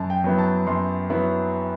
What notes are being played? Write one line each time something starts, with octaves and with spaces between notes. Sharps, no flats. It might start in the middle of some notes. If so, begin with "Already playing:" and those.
Already playing: F#2 A5
G5
F#3 B3 E4
A5
F#2 C6
F#3 B3 E4